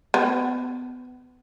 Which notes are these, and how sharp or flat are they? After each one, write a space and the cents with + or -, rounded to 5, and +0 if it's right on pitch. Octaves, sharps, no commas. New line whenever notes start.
B3 +25